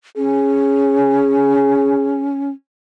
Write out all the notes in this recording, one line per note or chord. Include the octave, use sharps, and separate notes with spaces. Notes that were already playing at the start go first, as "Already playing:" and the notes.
C#4 G#4